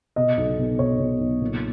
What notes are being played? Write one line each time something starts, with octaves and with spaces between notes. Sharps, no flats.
B2 D#5
B1
B2
B1 C#5
B2
B1
A#2